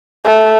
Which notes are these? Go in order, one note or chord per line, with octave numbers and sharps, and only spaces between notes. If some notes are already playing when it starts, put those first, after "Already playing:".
A3